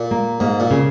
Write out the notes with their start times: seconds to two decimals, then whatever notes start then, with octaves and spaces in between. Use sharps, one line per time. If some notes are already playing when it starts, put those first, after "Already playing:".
Already playing: A#2
0.11 A#3
0.40 G#2 A#3
0.60 A#2
0.71 C#3